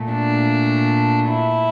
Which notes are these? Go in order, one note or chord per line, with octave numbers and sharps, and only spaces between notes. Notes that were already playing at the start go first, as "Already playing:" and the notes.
Already playing: A#2 A3
D4
E4